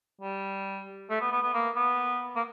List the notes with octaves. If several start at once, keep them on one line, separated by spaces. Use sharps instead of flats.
G3
A3
B3
B3
B3
A#3
B3
A#3